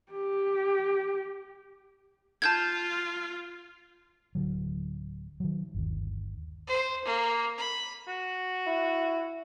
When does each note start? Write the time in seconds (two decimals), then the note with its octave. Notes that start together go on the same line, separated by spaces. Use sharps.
0.12 G4
2.42 F4 A5 G6 G#6
4.35 D1 D3 F#3
5.40 D#3 F#3
5.74 G1 D#2
6.67 C5
7.04 A#3
7.57 B5
8.08 F#4
8.67 E4